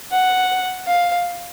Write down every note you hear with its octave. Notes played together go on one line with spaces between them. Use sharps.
F#5
F5